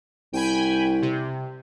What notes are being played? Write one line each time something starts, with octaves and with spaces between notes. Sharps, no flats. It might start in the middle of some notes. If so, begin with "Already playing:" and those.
C2 G5 G#5 B5
C3